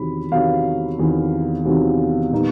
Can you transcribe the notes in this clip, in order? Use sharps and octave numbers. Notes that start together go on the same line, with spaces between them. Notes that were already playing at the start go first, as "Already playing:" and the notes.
Already playing: E2 C3 D#3 F#3 B5
E2 C3 D#3 F#3 F5
E2 C3 D#3 F#3
E2 C3 D#3 F#3
A#2 G3 B3 D#4